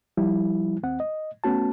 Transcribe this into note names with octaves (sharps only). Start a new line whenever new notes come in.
F3 G3 E4
D#2 C4 F#5
D#5
A3 B3 C#4 F#4 A5